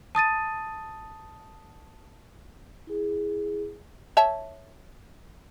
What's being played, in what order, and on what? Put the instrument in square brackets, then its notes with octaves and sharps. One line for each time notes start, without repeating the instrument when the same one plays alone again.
[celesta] A5 D#6 A6 D#7
[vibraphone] E4 G#4
[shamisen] C#5 E5 A5